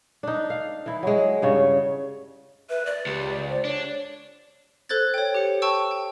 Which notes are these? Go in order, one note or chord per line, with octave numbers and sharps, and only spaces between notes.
D4 D#4
F5
E3 E4
F#3 G#3
G2 C#3 C#5
B4 E5
B4 D5
C#2 G4
C5
D4 C#5
A4 C5 F#6 G#6 A6
C#5 G5
G4 C5 C#7
G5 A5 C#6 E6
G5